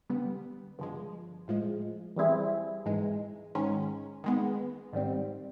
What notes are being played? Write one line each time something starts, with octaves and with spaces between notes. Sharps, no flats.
D3 G3 B3
G2 D3 F3 G#3
A2 F3 G#3
E3 G3 C4 E4 G#4
G#2 E3 G#3
G#2 D#3 G#3 C#4
D#3 G#3 B3
G#2 D#3 G3 C4